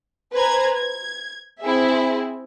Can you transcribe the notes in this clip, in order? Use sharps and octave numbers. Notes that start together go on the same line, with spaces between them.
B4 C5 G#5 A#5 G#6
G#6
C4 E4 G#4 E5